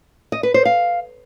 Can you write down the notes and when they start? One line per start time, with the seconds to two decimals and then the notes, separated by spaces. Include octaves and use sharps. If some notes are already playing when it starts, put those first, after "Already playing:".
0.32 D#5
0.43 B4
0.54 C5
0.65 F5